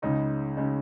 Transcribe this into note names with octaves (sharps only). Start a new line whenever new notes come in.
C#2 C#3 G#3 D#4
C#3 G#3 D#4